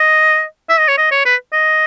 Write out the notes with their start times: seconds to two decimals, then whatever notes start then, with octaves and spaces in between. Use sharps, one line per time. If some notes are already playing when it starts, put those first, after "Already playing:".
Already playing: D#5
0.69 E5
0.79 D#5
0.88 C#5
0.98 D#5
1.11 C#5
1.26 B4
1.53 D#5